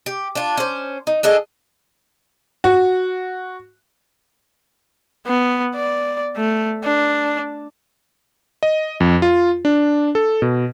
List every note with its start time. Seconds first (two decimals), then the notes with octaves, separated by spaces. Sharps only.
0.06 G4
0.35 D4 F4
0.57 C#4 C5
1.07 D#4
1.23 D4 G#4 A4 D#5
2.64 F#4
5.27 B3
5.76 D5
6.36 A3
6.84 D4
8.63 D#5
9.00 F2
9.22 F4
9.65 D4
10.15 A4
10.42 B2